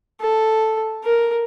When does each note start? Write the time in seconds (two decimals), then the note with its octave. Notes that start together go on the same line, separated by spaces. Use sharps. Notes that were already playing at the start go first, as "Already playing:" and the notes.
0.21 A4
1.04 A#4